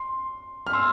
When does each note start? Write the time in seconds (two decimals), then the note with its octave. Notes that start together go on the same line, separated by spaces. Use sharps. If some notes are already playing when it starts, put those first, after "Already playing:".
Already playing: C6
0.67 F6
0.73 C6 E6